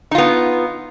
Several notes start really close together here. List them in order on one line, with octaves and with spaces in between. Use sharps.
D#4 F4 B3